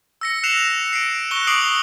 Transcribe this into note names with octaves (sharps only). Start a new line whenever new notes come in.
E6 A#6 C#7
F#6 C7 C#7 E7 F7
C7 D7
C#6 F#6 G7
D6 D#6 C7 D7 F7 F#7